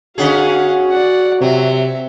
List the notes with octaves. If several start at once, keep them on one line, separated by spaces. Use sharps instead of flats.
D3 C#4 F#4 G#4 F5 F#5
D5 F#5
C3 F#3 C4 E5